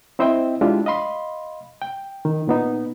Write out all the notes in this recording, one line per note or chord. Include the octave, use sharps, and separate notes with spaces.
C4 E4 C5 D#5 E5 G5
G#3 D4 E4 F4 G4
D#5 F5 B5 C6
G5
D#3
A#2 B3 D#4